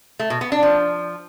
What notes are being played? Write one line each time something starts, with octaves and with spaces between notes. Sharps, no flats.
A3
B2
B3
D4
F3